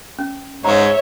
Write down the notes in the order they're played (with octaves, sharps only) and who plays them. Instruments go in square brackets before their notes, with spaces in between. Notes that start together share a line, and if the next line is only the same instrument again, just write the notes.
[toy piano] C#4
[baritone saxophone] G#2 [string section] C#5 E5 [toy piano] A#5